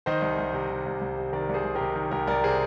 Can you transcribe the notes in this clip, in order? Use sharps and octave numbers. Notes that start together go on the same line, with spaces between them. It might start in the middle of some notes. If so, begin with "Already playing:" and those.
D#3 C5 D#5
C2
C2
C3
D#3
C2
C2
C3
D#3 A#4 D5
C2
G#4 C5
C2
G4 A#4
C3
D#3
C2 G4 A#4
C2 A#4 D5
C3 G#4 C5